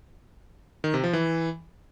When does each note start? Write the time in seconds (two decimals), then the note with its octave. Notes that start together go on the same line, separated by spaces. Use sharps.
0.84 D#3
0.94 C3
1.04 F3
1.13 E3